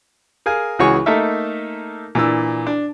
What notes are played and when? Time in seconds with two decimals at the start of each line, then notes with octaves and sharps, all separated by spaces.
0.46 G#4 A#4 F5 G#5
0.79 C#2 E3 F#4 G#4 C#5 C#6
1.06 A3 A#3 D#4 A4 A#4 E5
2.15 A#2 E3 D4 E6
2.67 D4